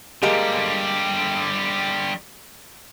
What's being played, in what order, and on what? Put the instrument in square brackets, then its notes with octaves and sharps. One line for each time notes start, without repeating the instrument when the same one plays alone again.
[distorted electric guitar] D3 G3 [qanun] G#3 A#3 G4